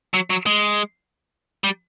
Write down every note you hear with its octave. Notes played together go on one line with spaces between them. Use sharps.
F#3
F#3
G#3
G3